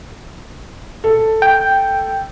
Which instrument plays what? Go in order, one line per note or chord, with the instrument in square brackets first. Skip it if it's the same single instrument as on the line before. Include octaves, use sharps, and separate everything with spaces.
[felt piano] A4
[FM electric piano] G5